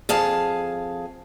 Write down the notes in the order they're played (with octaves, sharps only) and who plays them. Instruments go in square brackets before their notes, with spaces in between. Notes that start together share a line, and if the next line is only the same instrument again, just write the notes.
[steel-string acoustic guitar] F2 G#4 F5 A5